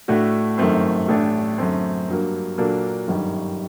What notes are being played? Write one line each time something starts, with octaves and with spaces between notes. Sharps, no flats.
A2 A3 D4 F#4
G1 F#2 D#3 A3 C4
A1 A2 A3 D4
F#2 D3 A3 C4
G2 F#3 A#3
A#2 F#3 A#3 D4 A4
G1 F#2 D#3 G3